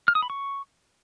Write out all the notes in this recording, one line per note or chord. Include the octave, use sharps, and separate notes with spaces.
F6
D#6
B5
C#6